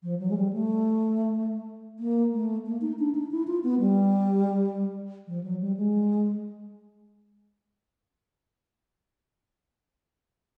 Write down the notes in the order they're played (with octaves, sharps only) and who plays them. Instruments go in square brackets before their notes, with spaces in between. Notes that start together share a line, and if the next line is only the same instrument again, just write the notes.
[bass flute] F3
F#3
G#3
G3
A3
A#3
A3
A#3
D#4
D4
D#4
E4
F4
B3
G3
F3
F#3
G3
G#3